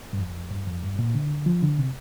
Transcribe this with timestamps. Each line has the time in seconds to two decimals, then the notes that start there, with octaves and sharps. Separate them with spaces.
0.13 G2
0.19 F2
0.50 G2
0.67 F2
0.83 G2
0.99 A#2
1.15 D3
1.46 F3
1.63 D3
1.78 C3